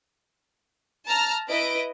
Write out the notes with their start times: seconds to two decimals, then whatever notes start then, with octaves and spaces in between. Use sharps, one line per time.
1.08 A5 A#5 F6
1.48 E4 B4 D#5 D7